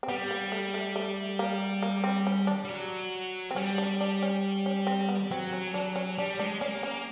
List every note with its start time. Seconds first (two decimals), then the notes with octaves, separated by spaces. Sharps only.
0.03 C4
0.08 G3 B3
0.31 A#3
0.52 A3
0.74 A3
0.96 A3
1.39 A#3
1.83 A#3
2.04 C4
2.27 C#4
2.47 D4
2.64 G3
2.70 F#3
3.51 C4
3.56 G3 C#4
3.78 D4
4.01 D4
4.22 C#4
4.66 C#4
4.87 C4
5.09 B3
5.31 F#3 C4
5.53 C#4
5.74 F#3 D4
5.96 C#4
6.18 G3 D4
6.39 G#3 D4
6.61 A#3 C#4
6.83 A#3 C#4